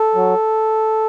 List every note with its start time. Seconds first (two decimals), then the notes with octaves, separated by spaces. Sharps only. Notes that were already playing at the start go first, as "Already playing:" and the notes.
Already playing: A4
0.15 F#3